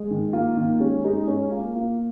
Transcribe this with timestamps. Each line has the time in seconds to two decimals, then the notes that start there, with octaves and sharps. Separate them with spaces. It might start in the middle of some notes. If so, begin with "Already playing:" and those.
Already playing: G#3
0.11 D#3
0.33 A#3 F4
0.57 D#3
0.80 G#3 C#4
1.04 G#3 D#4
1.27 G#3 C#4
1.51 A#3 F4
1.75 A#3 F4